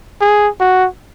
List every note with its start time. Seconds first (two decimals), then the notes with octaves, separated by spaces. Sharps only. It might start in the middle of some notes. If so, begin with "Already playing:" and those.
0.21 G#4
0.60 F#4